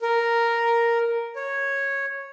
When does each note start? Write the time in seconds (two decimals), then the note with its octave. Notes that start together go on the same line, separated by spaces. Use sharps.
0.02 A#4
1.36 C#5